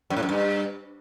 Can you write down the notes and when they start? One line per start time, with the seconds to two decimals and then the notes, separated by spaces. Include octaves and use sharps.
0.10 F#2
0.16 A2
0.23 F#2
0.29 G2